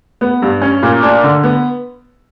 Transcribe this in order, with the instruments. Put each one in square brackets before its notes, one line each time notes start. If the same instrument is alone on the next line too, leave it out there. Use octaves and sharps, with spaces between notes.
[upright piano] B3
G2
C#4
A#2
D4
D3
B3